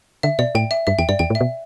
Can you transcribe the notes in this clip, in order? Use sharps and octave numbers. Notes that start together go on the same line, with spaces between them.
D3 E5
B2 D5
A2 G5
E5
G2 E5
E2 G5
G2 D5
E2 G5
A2
E5
B2